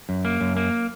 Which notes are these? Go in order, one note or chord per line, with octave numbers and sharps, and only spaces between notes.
F#2
A#3
F#2
A#3